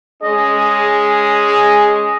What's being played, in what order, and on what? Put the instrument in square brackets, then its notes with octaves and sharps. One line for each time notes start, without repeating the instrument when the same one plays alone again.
[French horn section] G#3 C#4 G#4 [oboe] D#5